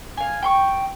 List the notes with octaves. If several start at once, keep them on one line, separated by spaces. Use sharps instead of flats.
F5 G#5
G5 C6 C#6